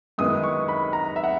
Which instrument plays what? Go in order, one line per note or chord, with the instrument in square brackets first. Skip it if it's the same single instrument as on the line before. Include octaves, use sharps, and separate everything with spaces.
[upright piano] F#2 D#3 G#3 B3 E4 [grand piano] D#6
[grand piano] C#6
B5
A#5
E5
F#5